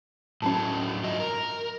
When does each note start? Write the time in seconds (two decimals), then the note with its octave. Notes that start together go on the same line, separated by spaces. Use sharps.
0.42 A2 F#3 A3 C#4 A5
1.04 G#2 F4 D#5
1.20 A#4